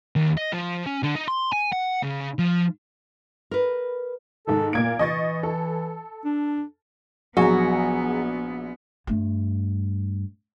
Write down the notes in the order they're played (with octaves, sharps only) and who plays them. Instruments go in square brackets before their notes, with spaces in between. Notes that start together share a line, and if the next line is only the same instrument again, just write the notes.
[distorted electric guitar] D#2
D#5
F3
C#4
D3
D#4
C6
G#5
F#5
C#3
F3
[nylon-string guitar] A#4 B4
[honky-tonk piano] G#2 D#3 [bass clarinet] A4
[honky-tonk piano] A#2 G#6 D7 [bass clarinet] A#3
[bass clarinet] E3 [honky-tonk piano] D#5 C#6 A6
[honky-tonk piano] A4
[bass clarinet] D4
[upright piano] A#1 F#3 [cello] B3 [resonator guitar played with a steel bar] F#4 [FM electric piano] G#4 G#5 A#5
[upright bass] G2 A3